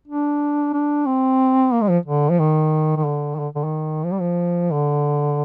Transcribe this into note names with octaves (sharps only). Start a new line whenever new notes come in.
D4
D4
C4
A#3
G#3
F3
D3
F3
D#3
D#3
D3
D#3
D3
D3
D#3
F3
G3
F3
D3